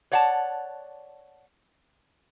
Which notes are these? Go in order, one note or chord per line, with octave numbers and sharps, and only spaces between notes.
C#5 D5 F#5 G5 A5